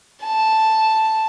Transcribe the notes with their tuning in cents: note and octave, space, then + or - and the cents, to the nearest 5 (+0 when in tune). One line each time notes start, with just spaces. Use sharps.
A5 +0